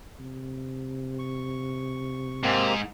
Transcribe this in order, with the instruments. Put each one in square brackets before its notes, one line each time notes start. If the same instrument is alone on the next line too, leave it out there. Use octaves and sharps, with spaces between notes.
[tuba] C3
[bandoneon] C#6
[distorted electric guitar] G#2 [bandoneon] A#3 C4 G4